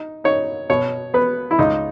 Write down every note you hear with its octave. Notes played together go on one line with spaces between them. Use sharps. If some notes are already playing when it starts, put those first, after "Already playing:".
Already playing: D#4
D#4 C#5
B2 C#5
B3 B4
E4
C#2 D#4